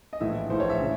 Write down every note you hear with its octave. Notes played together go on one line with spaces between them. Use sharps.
D#5
A#1 A2 E3 E5
A#1 A2 E3 C5
C#5
E5
C#3